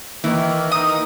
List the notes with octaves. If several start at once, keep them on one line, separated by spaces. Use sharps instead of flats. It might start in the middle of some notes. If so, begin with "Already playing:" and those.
D#3 E3 A#3
D#4 D#6